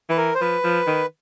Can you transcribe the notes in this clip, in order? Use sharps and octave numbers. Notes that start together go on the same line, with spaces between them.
E3 B4
A#4
C5
F3 B4
F3
D#3